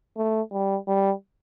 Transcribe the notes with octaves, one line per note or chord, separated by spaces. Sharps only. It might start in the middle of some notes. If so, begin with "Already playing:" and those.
A3
G3
G3